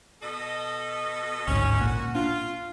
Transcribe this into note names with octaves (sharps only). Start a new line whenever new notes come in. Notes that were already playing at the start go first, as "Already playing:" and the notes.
B2 A4 D#5
A1 D2 G#2 C#4
A#2 F#4
D4 F4